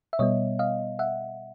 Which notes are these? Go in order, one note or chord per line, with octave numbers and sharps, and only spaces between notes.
E5
B2 G3 B3 C#5 D#5
D#5 F5
E5 F#5